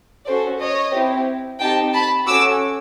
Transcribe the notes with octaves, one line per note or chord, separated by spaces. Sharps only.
C#4 F#4 A4 C5 D5
C#5 D#5
C4 E4 G4
C4 D#4 G4 G5 A5
A5 B5
C#4 F#4 A4 D6 E6